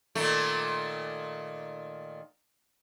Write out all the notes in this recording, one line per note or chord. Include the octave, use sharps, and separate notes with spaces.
A#2 D#3 A3